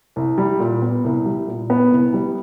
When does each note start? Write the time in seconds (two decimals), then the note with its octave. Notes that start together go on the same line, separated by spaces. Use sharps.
0.16 C2
0.38 G3
0.59 A#2
0.82 B3
1.04 C2
1.26 G3
1.47 A#2
1.70 B3
1.92 C2
2.14 G3